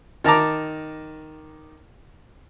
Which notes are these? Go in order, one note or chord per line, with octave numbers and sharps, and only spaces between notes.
D#3 A5 A#5 D6